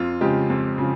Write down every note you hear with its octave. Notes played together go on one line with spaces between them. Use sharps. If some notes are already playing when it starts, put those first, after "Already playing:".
Already playing: F2 F4
C#3 F3 G#3 G4
F2
C#3 F3